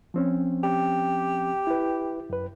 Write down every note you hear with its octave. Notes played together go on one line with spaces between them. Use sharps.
F3 C4 C#4
G4
E4 B4
F#2 B4